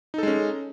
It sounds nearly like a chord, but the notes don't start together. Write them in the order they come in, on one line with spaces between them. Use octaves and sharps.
D#4 A4 G#3 C#4